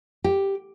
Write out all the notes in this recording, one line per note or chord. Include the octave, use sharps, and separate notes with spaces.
G4